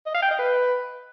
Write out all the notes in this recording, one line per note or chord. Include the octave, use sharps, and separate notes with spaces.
D#5
F5
G5
D#5
B4